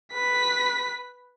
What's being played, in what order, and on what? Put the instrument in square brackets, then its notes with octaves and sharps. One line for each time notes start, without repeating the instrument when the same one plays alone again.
[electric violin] B4 B6